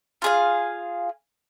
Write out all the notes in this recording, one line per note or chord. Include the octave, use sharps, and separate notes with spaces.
F4 G#4 F5